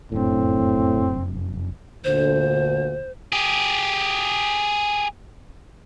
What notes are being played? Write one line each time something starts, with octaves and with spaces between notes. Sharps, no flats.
F1 F#2 A2 C4 D4
D2 A#2 D3 C5
G4 G#4